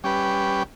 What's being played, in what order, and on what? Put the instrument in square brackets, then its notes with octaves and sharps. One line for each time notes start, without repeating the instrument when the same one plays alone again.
[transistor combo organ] G3 C#4 G4 B4